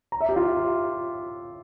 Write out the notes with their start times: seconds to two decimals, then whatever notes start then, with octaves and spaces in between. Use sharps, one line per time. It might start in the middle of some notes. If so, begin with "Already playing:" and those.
0.12 A#5
0.21 E5
0.29 G4
0.36 F4